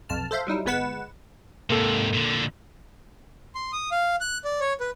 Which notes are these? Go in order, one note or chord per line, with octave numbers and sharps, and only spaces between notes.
B1 F2 A5 F6
A4 C5 E5 F5
F#3 G3 D#4 E4
G1 G#3 B3 B4 F#5 E7
G#2 C3 A#3 A4
A#2 D3
C6
D#6
F5
F#6
D5
C#5
B4